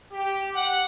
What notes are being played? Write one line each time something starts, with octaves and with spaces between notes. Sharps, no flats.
G4
F#5